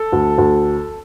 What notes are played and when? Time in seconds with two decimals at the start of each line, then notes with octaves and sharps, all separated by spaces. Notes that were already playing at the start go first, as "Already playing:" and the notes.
Already playing: A4
0.12 D2
0.38 D2